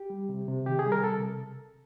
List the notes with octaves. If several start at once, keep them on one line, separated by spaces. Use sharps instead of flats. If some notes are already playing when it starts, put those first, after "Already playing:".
Already playing: G4
G3
C3
C3
D#3 G4
G#4
G3
A#4
C3 A4